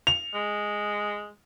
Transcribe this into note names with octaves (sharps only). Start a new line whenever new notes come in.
F7
G#3